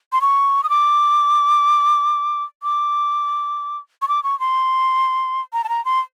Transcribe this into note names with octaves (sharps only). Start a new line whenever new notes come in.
C6
C#6
D#6
D6
D6
C#6
D6
C#6
C6
A#5
A5
A#5
C6